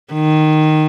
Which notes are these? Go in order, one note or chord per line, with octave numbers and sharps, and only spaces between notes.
D#3